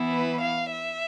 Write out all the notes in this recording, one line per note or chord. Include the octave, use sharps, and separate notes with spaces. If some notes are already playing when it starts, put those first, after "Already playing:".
Already playing: E3 B3 E4
B4
F5
E5